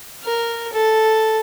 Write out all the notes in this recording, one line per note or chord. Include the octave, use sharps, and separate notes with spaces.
A#4
A4